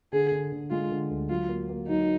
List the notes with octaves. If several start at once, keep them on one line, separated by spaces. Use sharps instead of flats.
D3 G#4
D3
D3
G#3 F4
D3
D2
F#3 F4
A#3
A#3
F#3 D#4